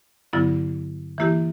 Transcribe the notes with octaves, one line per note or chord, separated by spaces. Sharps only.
G2 D3 F#3 B3 E4
E3 A#3 E4 G4